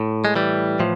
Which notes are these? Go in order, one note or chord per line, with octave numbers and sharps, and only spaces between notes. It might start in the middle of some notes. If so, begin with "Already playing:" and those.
Already playing: A2
G#3
E3 G3
A2 F3